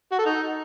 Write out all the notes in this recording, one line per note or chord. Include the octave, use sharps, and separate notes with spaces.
F#4
A4
D#4